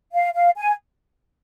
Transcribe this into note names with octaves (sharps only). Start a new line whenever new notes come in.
F5
F5
G#5